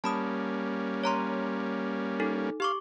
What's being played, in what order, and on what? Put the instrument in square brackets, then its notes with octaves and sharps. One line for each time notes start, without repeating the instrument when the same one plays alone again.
[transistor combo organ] G3 A#3 C#4 [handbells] A5 B5 D#6
[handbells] C#5 A#5 C6
D#4 A4
[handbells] G4 C#6 D6 [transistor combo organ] F5